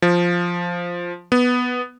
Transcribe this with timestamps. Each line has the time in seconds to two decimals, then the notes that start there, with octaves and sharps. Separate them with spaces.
0.02 F3
1.32 B3